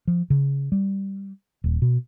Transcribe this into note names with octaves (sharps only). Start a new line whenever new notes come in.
F3
C#3
G3
D#1
B2